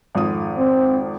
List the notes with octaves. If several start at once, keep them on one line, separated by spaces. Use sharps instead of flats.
G#1 F2 D#6
C4